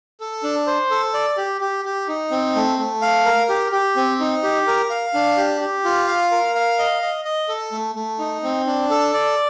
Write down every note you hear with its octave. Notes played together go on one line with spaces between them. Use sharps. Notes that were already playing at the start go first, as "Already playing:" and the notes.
A4
D4
C5
A4
D5
G4
G4
G4
D#4
C4
A3
A3
F5
A#4
G4
G4
C4
D#4
G4
A#4
F5
D4
G4
G4
F4
F5
A#4
F5
D#5
D#5
D#5
A4
A3
A3
D#4
C4
D4
A4
D5